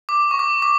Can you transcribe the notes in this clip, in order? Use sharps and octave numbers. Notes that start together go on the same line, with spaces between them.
D6
C#6
D6
D6